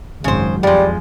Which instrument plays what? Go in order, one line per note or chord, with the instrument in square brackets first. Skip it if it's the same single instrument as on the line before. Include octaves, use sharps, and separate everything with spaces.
[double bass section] G#1 F#2 F#3 [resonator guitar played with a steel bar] C#3 C5
[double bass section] F2 [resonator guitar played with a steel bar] F3 G#3 [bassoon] G3